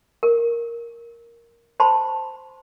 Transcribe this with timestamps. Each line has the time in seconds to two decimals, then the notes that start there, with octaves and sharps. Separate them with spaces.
0.23 A#4
1.80 C5 A5 B5 C6